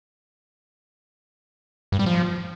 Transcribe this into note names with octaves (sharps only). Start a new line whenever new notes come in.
G2
G3
F3